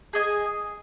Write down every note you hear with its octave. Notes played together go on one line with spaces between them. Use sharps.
G#4 D#5 G#5